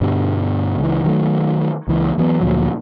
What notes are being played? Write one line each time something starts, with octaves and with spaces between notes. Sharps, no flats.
G2 B2 D3 G3
C#2 E3
D#3 F#3 A3
C#2 E3
E3 F#3 B3
D2 A#2 F3 F#3